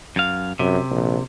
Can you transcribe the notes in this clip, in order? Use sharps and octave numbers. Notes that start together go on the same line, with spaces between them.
F#2 F5
F#2 C3
A#1